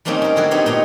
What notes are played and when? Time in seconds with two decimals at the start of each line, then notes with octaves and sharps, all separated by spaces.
0.05 G3 A3 A#3 C4 C#4 D#4
0.22 C#4 A#4
0.36 D3 E4 F#4 G#4 A4
0.51 B3 C4 D#4 G4 C#5
0.66 A#2 D#4 C#5 D#5 A#5